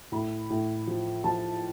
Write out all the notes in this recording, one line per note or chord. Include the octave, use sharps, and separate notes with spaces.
A2 B5
A2
F3
F3 A5